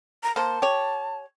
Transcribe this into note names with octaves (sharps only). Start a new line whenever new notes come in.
A#5
A#3 C5 A5
G4 C#5